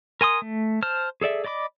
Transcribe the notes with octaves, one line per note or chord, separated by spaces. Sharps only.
A#4 G#5 C6 D#6
A3
C5 A5 F6
G#4 A4 D5 E5
D5 D#5 B5 D6